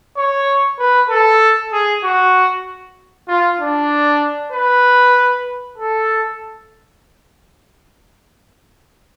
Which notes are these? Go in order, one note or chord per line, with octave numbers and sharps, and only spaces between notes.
C#5
B4
A4
G#4
F#4
F4
D4
B4
A4